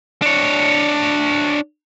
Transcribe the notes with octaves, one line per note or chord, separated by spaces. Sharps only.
D4 C#5